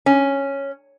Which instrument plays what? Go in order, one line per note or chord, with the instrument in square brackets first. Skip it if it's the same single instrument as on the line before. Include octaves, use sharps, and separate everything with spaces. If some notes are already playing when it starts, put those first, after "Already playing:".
[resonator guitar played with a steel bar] C#4